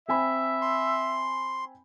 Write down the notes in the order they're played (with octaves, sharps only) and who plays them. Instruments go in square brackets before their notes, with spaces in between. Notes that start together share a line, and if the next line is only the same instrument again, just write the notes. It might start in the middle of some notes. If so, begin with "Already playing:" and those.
[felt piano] C4 G#5 B5 [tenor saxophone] E5
[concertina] C6